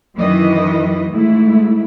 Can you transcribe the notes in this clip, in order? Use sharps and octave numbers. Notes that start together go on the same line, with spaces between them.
F#2 D#3 E3 E4 B4 D#5
G#2 A3 E4